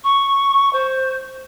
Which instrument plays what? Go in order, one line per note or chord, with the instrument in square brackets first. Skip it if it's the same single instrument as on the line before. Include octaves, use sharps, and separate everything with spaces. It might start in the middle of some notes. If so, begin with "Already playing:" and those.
[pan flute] C#6
C5